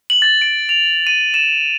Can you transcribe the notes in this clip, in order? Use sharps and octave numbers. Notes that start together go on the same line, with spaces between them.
F#7
A6
D7
F7
D#7
E7